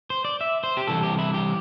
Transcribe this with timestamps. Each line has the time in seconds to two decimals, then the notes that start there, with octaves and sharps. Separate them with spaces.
0.10 C5
0.25 D5
0.41 E5
0.64 C5
0.77 G4
0.87 C2 C3 E3 A4
1.03 G4
1.19 E4
1.34 G4